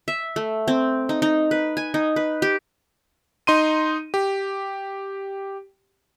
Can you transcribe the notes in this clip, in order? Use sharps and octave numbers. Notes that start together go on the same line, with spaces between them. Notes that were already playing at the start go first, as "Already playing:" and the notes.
E5
A3
C4
D#4
D#4
B4
G#5
D#4
B4
G4
D#4 C6 D#7
G4